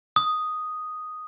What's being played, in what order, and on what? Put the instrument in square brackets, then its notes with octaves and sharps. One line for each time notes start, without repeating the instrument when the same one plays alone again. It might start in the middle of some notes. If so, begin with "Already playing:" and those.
[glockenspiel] D#6